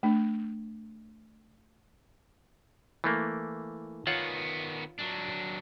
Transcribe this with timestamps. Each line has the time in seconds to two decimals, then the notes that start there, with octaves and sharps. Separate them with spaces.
0.03 A3 D4
3.04 E3 A3 A#3
4.07 D#3 B3 F4 C#5 F#5
4.99 F#3 D4